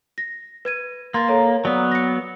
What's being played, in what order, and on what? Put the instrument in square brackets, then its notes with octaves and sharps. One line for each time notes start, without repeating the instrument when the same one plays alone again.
[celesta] A#6
B4 G#6 D#7
[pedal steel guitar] A#3 [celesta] C6 A6
[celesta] A4 C#5 A#5
[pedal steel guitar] F#3 B3 [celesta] D5
[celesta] A#6 C#7